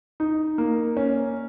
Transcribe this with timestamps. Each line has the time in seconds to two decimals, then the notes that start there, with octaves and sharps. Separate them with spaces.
0.20 D#4
0.58 A#3
0.97 C#4